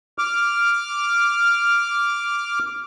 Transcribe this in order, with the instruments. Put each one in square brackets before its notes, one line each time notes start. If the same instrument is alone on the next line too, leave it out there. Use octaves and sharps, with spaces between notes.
[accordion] D6 F6